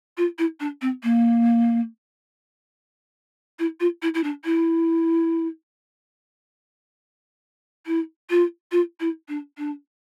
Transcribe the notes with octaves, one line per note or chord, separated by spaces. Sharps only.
F4
E4
D4
C4
A#3
E4
F4
E4
E4
D4
E4
E4
F4
F4
E4
D4
D4